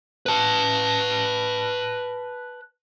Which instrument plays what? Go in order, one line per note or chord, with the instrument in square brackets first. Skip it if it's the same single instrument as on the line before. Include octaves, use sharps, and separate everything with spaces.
[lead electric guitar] B4 A5